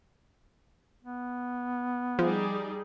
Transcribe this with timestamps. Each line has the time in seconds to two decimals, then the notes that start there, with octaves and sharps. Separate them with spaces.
1.03 B3
2.19 F3 G3 D#4 G#4